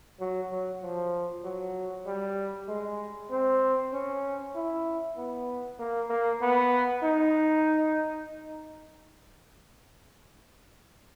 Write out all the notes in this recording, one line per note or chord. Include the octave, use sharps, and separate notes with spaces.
F#3
F#3
F3
F#3
G3
G#3
C4
C#4
E4
B3
A#3
A#3
B3
D#4